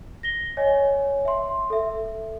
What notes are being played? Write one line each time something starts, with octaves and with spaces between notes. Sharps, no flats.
A#6 G7
C#5 D#5 G#5
E5 C6
A4 E5